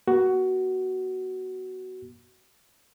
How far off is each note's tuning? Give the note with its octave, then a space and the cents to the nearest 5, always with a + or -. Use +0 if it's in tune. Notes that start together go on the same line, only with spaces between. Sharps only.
B3 -45 F#4 +15